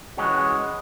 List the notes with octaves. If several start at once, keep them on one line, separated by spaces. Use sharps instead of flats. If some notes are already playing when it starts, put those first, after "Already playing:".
E3 G#3 C#4 F#4